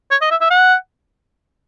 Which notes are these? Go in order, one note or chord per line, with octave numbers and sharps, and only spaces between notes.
C#5
D#5
E5
E5
F#5